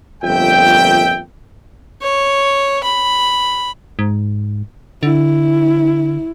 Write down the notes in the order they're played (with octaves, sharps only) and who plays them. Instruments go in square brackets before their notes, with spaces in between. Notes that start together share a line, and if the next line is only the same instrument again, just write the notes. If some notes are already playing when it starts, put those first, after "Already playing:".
[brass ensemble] G1 F2 A#2 E5 G5
[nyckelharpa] C#5
B5
[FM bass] G#2
[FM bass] D3 [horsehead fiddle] E4